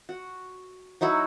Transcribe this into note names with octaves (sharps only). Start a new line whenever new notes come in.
F#4
F#3 D#4 E4 F#4